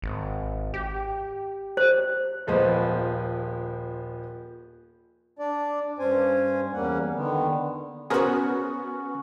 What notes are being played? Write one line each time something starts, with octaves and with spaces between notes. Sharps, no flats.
G#1
G4
C5
D#1 F3 G#3 B3 C5
D4 D5
G2 C#4 C5 G#5
E2 G3 A#3 C#4 F#5
D3 D#3 B3
B3 C#4 F#4 G#4 A#4 C5